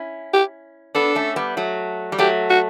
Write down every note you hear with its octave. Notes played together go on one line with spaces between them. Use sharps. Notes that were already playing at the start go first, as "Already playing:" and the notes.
Already playing: C#4 E4
G4
B3 D4 A4
A3 C#4
G3 B3
F#3 A3
G3
F#3 A3 G4
F#4